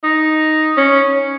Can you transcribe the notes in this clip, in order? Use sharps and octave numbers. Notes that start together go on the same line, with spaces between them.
D#4
C#4